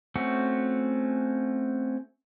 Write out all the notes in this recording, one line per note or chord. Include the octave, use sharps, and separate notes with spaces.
A3 C4 C#4 F#4